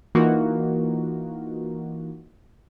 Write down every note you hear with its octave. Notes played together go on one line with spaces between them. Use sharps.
E3 A#3 D#4 F4 F#4 A#4